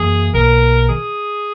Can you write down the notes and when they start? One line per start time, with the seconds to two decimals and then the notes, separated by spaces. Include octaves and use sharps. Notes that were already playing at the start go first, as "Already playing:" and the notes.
Already playing: F#2 E3 A#3 G#4
0.34 B1 B2 A#3 A#4
0.89 D#3 G#4